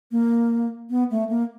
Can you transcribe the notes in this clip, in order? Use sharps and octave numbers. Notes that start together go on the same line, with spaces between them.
A#3
B3
A3
A#3